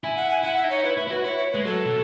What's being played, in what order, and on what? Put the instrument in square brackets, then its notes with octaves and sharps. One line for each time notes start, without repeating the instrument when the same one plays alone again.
[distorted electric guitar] E4 [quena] G#5
[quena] F#5
G#5
[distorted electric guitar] E4 [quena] F#5
[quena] E5
[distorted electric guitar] D#4
[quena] C#5
[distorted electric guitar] E4 [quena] B4
[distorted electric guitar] E4 [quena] B4
[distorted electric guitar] E4
[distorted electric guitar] F#4 [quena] B4
[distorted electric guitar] E4 [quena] C#5
[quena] C#5
[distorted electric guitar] G#3 [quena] B4
[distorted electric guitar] F#3 [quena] A4
[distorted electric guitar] B2